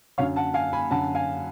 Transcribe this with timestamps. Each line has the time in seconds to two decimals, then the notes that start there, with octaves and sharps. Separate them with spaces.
0.18 F#2 D3 C#5 F5
0.36 F#5 A5
0.54 F5 G#5
0.73 G#5 B5
0.91 F#2 D3 F#5 A5
1.15 F5 G#5